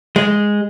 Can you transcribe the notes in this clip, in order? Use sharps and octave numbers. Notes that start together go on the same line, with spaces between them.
G#3